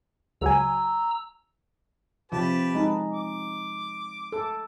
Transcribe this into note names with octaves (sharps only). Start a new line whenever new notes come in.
C#2 F#3 G#5 A#5 E6
C3 F3 G4 B4 A5
G#3 D#4
D6
A4